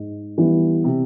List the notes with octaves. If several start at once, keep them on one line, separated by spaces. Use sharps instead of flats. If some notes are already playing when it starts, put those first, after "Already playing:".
Already playing: G#2
E3 G3 B3 E4
C3